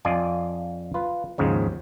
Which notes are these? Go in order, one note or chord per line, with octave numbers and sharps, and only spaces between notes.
F2 F4 D5 D#5 G#5
F4 B4
D#2 G#2 C#3 F3